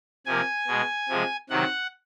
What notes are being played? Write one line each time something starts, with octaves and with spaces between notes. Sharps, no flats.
C3 F3 A#3 G#5
B2 G#3
C3 F3 G#3
C3 D#3 F#3 F#5